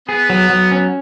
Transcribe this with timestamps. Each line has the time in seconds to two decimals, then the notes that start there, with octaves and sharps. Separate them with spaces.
0.09 B3 G#4
0.30 F#3
0.50 F#3
0.72 C#4